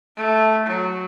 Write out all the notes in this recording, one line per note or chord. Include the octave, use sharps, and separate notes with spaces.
A3
F#3